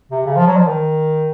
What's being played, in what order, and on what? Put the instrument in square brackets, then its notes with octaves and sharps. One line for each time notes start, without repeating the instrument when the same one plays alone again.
[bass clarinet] C3
C#3
F3
F#3
F3
D#3